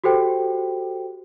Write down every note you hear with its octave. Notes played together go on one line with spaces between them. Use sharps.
F#4 G4 A4 C5 G5